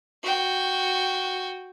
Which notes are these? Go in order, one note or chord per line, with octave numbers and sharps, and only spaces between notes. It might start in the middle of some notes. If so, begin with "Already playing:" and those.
F#4 G5